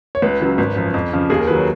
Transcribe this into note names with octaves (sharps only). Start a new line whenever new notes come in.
C#5
C#2 B4
C#3 F#3
G#1
F#2 F3
F2
C#3 F3
D#2 G#4
A#4
D#3 F#3 B4
C#5